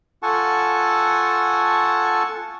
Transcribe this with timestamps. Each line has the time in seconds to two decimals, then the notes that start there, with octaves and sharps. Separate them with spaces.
0.23 F4 A4 F#5 G#5 A5 C#6